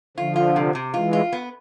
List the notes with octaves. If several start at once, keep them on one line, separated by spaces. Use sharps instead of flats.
D3 F3 F4
F4
C3
C3
E3 G#3 F4
F4
B3